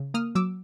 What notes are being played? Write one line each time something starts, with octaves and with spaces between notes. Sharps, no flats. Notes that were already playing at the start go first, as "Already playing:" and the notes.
Already playing: C#3
A#3 D#6 F6
F#3 D6 E6